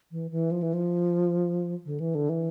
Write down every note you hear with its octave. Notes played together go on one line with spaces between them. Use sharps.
E3
E3
F3
E3
F3
D3
E3
D3
E3